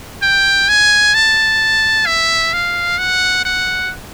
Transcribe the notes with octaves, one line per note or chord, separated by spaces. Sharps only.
G5
G#5
A5
E5
F5
F#5
F#5